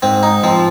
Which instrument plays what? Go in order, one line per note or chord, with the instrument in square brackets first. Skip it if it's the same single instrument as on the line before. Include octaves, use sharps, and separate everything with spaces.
[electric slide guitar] G#2 [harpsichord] C4
[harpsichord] D#4
[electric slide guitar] F3 [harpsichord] C4